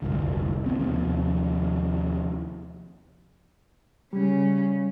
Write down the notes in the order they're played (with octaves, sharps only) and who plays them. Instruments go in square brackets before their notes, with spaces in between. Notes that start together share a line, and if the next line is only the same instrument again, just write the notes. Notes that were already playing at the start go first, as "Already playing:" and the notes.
[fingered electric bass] F1 C2 G2 D3
C#2 A#2 B3 C4
D#2 C3 F3 C4
[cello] C#3 C#4 [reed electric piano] G3